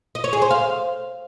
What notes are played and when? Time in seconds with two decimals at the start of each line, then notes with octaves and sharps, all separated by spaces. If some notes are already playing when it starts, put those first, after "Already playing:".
0.15 D#5
0.24 C#5
0.33 G#4
0.42 C5
0.51 F5